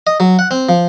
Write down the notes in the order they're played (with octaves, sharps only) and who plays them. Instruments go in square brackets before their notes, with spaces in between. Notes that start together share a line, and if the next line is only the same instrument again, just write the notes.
[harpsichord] D#5
F#3
F#5
C4
F3